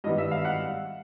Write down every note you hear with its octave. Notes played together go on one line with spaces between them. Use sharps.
G2 D#3 G3 B3 D#5
E5
F5
F#5